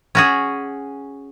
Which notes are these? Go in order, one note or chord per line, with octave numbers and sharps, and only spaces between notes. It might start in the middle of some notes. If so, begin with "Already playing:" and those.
C#4 F#4 G#4